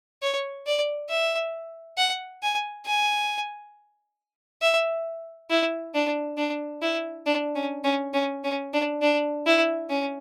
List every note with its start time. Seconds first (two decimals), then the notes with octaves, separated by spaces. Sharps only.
0.22 C#5
0.67 D5
1.10 E5
1.98 F#5
2.43 G#5
2.86 G#5
4.62 E5
5.50 E4
5.95 D4
6.38 D4
6.82 E4
7.26 D4
7.55 C#4
7.84 C#4
8.14 C#4
8.44 C#4
8.74 D4
9.02 D4
9.46 E4
9.90 C#4